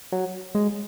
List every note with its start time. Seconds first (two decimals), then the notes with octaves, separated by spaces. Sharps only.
0.12 F#3
0.55 G#3